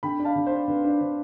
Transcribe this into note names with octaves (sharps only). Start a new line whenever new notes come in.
D3 G5 B5
D4
F5 A5
D3
D4 C5
D3 B4
D4
D3 C5